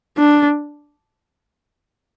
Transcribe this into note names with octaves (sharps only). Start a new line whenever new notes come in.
D4